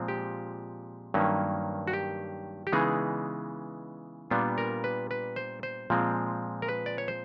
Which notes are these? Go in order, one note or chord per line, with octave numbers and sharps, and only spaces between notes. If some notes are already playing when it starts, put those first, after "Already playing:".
Already playing: A#2 F3 G#3 C4 F4
G4
G2 D#3 F#3 A#3 C#4
F#4
G4
G4
C#3 E3 G#3 B3 D#4 G#4
A#2 G3 B3 D4 F4
A#4
B4
B4
C5
C5
A#2 F3 G#3 C4
A#4
B4
D5
C#5
C5